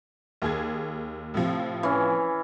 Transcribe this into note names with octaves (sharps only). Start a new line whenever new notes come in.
D#2 G#4 G#6
A2 C3 F3
E3 C#4